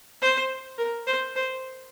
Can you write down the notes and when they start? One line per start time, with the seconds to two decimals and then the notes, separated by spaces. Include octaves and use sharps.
0.22 C5
0.78 A#4
1.07 C5
1.36 C5